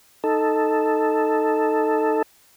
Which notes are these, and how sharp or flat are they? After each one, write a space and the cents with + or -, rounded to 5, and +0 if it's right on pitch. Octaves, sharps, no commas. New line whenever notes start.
D#4 +0 A4 +0